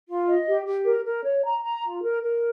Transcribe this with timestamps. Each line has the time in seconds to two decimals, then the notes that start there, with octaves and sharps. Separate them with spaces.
0.08 F4
0.28 D#5
0.47 G4
0.66 G4
0.86 A#4
1.06 A#4
1.24 C#5
1.44 A#5
1.64 A#5
1.83 F4
2.02 A#4
2.22 A#4